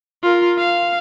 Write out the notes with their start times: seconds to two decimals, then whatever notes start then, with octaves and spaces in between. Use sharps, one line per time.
0.23 F4 A#4
0.59 F5